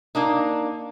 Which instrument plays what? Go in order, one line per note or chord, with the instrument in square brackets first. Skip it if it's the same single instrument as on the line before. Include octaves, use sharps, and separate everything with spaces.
[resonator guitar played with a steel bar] A#3 D4 D#4